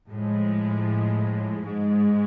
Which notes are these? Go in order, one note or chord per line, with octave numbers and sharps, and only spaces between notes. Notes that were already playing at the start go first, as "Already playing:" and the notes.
A2 F3 G#3
G#2 G#3